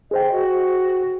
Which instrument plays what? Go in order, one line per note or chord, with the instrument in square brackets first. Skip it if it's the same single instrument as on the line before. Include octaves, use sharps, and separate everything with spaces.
[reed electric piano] G#4 C5 G5 [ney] D#5
[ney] F#4